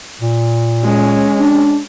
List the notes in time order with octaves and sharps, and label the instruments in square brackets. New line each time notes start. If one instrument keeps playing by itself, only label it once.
[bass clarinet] A#2
[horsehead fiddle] G#3 C#4
[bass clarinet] D4